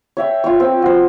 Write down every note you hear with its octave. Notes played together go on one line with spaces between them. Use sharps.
C#5 E5 G5
F4 C#5
C4 C5
F#4 C5